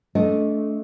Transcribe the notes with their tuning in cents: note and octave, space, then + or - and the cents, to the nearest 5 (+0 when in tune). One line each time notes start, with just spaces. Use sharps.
A3 -15 D4 -35 D#5 +0